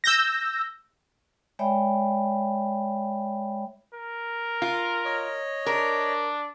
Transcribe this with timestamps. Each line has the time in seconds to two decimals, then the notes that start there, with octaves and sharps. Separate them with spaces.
0.04 E6 G6 A#6
1.59 G#3 C#5 D5 E5 G5 B5
3.94 A#4
4.62 F4
5.05 C#5 D#5
5.66 D4 A#4